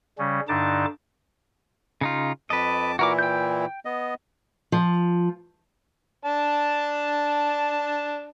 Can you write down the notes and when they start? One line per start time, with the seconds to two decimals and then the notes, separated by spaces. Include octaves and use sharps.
0.18 C#3 G3 C#4
0.48 G2 D3 D4 D#4 A5 D6
2.01 C#3 D#4 F4
2.50 F2 B4 D#5 A5 D6
2.99 A#2 E3 E4 F#4 A#4 D6
3.19 G5 G6
3.85 B3 D#5
4.72 F3
6.25 D4 A5